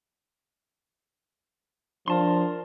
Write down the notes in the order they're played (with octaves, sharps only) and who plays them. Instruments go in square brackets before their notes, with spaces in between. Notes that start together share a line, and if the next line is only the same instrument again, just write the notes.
[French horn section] F3 D4 [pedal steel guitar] A#4 A5 C6